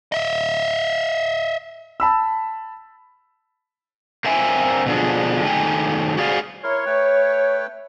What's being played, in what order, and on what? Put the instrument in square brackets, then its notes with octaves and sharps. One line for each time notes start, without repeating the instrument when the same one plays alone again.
[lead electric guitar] D#5 E5
[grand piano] A5 B5 E6
[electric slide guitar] A#3 C4 E5 G#5
B2 D3 F3 D4 G#4
D#3 A3 G4 G#5
F#4 G#4 D5 F5
[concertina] E4 A#4 C6 [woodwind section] C#5
[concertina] A3 B4 G5